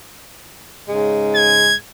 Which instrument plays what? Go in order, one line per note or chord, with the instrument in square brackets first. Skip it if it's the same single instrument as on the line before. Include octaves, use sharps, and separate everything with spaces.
[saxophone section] G#2 C#3 G#3
[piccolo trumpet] G#6